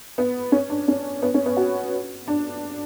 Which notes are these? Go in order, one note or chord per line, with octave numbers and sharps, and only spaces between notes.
B3
C#4
D4
C#4
B3
C#4
B3
F#4
D4